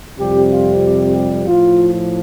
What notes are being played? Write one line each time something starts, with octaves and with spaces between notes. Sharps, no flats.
F2 C3 G3 G4
F4
G4
G4
A2 F3 F4